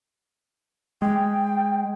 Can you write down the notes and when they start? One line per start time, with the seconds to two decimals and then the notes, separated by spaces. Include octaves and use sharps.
1.02 G#3 G5